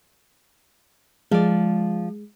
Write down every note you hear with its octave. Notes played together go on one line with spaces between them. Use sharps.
F3 G#3 D5